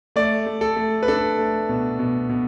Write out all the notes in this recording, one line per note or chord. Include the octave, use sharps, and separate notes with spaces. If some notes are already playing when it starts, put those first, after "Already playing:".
A3 D5
A3
A4
A3
B4
D4 A4
A3
B2
B2
B2